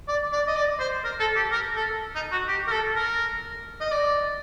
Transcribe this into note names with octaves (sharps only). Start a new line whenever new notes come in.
D5
D5
D#5
D5
C5
A#4
A4
G4
A#4
A4
D#4
F#4
G4
A#4
A4
A#4
D#5
D5